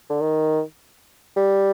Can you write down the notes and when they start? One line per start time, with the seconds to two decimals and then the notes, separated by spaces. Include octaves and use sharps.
0.10 D3
0.21 D#3
1.36 G3